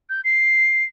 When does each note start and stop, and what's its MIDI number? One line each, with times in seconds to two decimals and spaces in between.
0.09 0.21 91
0.24 0.84 96